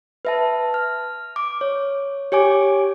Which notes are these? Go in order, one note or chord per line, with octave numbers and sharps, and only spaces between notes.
B4 E5 A5
F6
D6
C#5
G4 C#5 G#5 D6